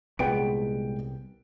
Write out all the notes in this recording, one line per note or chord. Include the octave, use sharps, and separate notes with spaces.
C2 A#2 G3 G#3 B3 G#4 G5 D7